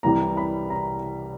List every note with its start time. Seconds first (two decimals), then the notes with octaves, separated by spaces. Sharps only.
0.03 C2 C3 E3 G3 A#5
0.37 B5
0.70 A#5